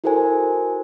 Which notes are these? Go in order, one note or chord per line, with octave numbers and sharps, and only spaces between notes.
E4 F#4 A4 A#4 C5 G#5